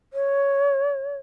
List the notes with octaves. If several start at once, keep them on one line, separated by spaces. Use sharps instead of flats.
C#5